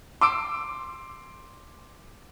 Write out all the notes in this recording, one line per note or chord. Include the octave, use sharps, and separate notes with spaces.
C6 D6 E6 D7